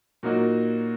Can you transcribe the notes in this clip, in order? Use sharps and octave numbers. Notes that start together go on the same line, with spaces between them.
A#2 F#3 A#3 D#4 F#4